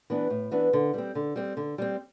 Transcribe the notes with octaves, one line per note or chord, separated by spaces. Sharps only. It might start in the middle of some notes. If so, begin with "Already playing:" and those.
E3 B3 D4
A2
E3 B3 D4
D3
G3 C4
D3
G3 C4
D3
G3 C4